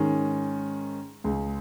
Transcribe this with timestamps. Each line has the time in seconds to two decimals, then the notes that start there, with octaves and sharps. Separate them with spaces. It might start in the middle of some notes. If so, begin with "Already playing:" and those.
Already playing: G#2 D#3 G#3 C#4
1.24 C#2 C#3 G#3